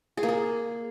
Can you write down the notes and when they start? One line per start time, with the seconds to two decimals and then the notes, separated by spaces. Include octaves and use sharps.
0.17 G#4
0.23 A#3
0.29 G#4